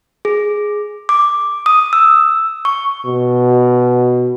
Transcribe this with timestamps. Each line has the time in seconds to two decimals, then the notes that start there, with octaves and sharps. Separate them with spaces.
0.25 G#4
1.09 D6
1.66 D#6
1.93 E6
2.65 C#6
3.06 B2